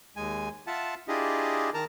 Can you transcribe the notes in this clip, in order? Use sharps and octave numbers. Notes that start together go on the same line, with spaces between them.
D#2 G#3 G#5
F4 E5 F#5 A5
D4 E4 F4 G4 G#4 D#5
D#3 A#4 A5 A#5